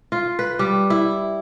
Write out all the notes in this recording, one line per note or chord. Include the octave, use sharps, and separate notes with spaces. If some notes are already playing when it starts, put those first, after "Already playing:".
F4
B4
G3
E4